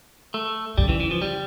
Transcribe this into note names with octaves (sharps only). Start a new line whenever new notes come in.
A3
C#3 G3
E3
E3
F3
G3